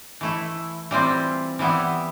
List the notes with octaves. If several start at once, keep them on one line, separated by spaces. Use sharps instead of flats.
E3 A3 E4
E3 G3 C4 F4
E3 G3 B3 E4